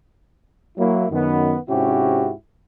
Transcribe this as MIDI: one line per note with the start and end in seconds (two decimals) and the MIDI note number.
0.77 1.06 54
0.77 1.06 58
0.77 1.06 64
1.10 1.55 42
1.10 1.55 51
1.10 1.55 59
1.69 2.30 44
1.69 2.30 48
1.69 2.30 61
1.69 2.30 64
1.69 2.30 66
1.69 2.30 67